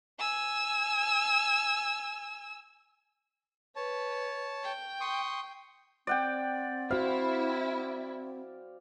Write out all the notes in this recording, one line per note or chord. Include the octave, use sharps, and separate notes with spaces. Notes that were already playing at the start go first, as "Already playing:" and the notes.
G#5 E6
B4 C#5 A5
G5
C6 C#6 D#6
C4 D5 F#5 G5
E4 F#4 C5 F5